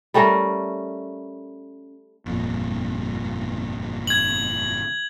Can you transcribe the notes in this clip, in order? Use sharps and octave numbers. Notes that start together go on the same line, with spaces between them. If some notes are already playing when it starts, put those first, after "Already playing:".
G3 A3 C#4 A#4
G1 F2 A#2
G#6 F#7